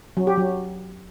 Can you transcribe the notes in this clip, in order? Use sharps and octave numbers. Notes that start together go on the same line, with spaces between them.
F#3
G4
F#3